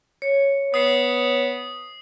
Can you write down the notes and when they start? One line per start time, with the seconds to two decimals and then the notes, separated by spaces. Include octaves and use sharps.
0.22 C#5
0.74 B3 D#6 C7